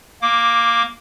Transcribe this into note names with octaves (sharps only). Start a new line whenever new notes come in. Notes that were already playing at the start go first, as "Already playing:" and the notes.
A#3 D6